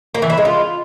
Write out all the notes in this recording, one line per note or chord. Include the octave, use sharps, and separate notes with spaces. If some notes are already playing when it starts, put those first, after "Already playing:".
A#3
E3
E4
G#3
F4